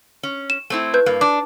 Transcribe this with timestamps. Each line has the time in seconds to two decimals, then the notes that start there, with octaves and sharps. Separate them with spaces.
0.23 C#4
0.50 E7
0.70 A3 C4 E4
0.94 B4 G6
1.06 G2 A#3
1.21 D4 D6